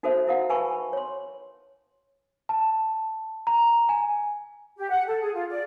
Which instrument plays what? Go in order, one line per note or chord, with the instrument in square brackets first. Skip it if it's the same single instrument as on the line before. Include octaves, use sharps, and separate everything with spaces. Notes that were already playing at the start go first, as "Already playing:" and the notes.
[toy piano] D#4 F#4 A4 A#4 C5 E5
E4 F#4 A#4 F5 F#5
B4 G#5 A5 B5 C#6
C#5 C6
[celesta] A5
A#5
G#5
[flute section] G4
F#5
A4
G#4
F4
D5